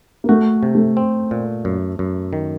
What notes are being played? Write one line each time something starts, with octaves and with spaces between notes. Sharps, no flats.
A#3
A3 F#4
C3
A3
C4
A#2
F#2
F#2
D#3